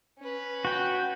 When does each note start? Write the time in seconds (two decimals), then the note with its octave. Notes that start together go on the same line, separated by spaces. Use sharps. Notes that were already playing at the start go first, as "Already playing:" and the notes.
0.19 C#4 B4
0.65 F#4 G5